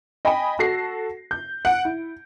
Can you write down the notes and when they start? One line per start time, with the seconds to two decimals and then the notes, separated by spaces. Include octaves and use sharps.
0.25 D#5 G5 G#5 B5
0.59 F#4 A4 A#6 C7
1.31 G6
1.65 F#5 D7
1.85 E4